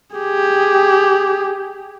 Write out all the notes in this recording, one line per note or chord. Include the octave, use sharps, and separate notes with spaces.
G4 G#4